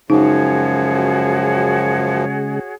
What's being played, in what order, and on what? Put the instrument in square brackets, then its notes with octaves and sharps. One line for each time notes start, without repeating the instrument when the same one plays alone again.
[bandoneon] F#2 F3 [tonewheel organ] C#3 G#3 [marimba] D#4 [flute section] F#4 G#4 C#5